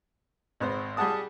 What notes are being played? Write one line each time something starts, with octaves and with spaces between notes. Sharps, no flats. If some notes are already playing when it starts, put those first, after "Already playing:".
G#1 B3 C5
G3 G4 G#4 F#5 A5 D#6